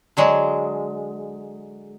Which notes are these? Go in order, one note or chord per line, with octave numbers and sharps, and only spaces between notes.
D3 F#3 G#3